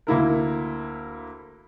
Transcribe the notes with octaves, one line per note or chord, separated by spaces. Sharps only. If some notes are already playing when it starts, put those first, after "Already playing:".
D2 A#3 E4 A#4